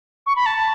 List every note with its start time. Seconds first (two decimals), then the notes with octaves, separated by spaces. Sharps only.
0.26 C#6
0.36 B5
0.46 A5